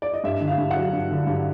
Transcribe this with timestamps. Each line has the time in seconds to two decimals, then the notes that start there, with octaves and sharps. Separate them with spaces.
0.02 D5
0.14 D#5
0.24 G2 E5
0.41 D3
0.48 F5
0.58 G2
0.71 F#5
0.76 F#3
0.93 G2
1.10 D3
1.27 G2